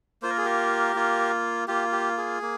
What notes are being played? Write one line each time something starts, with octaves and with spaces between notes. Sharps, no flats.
A#3 F4 C5
A#4
G#4
G4 A#4
A#3 F4
A#3 F4 G4
G4
G#4
A#3